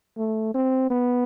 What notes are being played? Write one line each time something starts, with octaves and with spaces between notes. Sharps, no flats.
A3
C4
B3